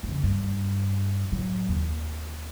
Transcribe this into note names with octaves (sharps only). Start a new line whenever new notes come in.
F2 C#3
G2
A2 F#3
D#2